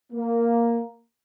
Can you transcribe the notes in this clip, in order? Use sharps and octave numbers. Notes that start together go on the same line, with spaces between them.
A#3